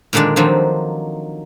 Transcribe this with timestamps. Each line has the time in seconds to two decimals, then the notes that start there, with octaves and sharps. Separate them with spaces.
0.13 A#2 D3 D#3 G#3 D4
0.36 D#3 F3 F#3 C4 D4